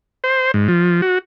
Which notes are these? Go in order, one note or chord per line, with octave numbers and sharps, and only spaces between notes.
C5
G#2
F3
F#4